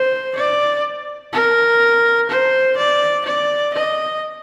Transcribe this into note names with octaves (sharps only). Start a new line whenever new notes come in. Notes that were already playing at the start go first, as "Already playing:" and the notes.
Already playing: C5
D5
A#4
C5
D5
D5
D#5